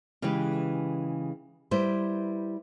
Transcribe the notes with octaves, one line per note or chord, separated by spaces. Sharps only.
C#3 E3 G#3 G4 B4
G3 E4 B4 C5